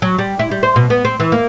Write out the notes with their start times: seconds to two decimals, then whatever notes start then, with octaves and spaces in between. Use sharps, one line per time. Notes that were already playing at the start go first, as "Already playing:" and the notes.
0.02 F#3
0.19 G3
0.39 E4
0.51 G3
0.63 C5
0.76 B2
0.90 B3
1.05 C4
1.20 E3
1.32 A#3